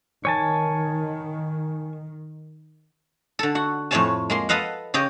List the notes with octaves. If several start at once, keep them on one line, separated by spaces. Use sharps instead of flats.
D#3 C#5 G#5 A5
D3 A4
F#4 F#5
F2 A2 A3 C#5 G#5 A5
G#3 A#3 C6
A4 B4 D#5 F5 F#5
C#3 G4 C#5 D#5